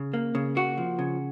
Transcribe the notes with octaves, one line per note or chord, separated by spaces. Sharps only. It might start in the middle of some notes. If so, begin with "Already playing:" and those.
Already playing: C#3
A#3
C#3
A#3 F#4
F3
C#3